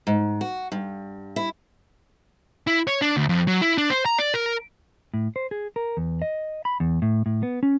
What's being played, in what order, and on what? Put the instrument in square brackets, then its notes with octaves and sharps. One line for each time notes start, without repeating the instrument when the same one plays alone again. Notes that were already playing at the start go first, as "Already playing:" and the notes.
[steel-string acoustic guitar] G#2
F#4
G2
E4
[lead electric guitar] E4
C#5
D4
D2
F2
F#3
E4
D4
C5
A#5
D5
A#4
[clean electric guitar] A2
C5
G#4
A#4
E2
D#5
B5
E2
A2
A2
B3
C#4